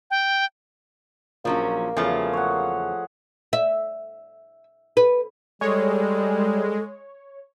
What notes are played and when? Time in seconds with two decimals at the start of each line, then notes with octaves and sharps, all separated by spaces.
0.11 G5
1.45 A#1 F3 F#3 A#3 C#4
1.97 E2 C#3 F3 F#3 A3 G#4
2.33 C#5 F#5
3.53 E5
4.97 B4
5.61 G3 G#3 A4 C#5